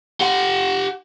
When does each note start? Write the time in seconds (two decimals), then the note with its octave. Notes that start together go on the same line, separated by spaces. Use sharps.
0.21 G4 F#5